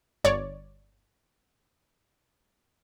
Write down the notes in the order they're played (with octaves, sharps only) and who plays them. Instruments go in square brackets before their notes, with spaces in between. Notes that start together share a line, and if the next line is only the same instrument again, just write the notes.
[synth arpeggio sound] G1 C#5 D5